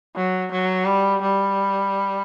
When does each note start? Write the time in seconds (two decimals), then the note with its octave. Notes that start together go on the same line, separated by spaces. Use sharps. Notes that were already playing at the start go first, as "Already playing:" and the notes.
0.16 F#3
0.52 F#3
0.86 G3
1.22 G3